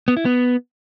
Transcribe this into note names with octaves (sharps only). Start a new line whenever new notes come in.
B3
E4
B3